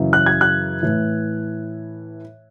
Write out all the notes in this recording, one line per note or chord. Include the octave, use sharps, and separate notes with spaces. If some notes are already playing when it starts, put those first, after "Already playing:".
Already playing: F#2 C#3 E3
F#6
G#6
F#6
A2 E3